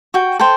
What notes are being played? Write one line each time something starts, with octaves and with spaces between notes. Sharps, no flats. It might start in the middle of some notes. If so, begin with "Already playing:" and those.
F#4 G5
A4 C5 G5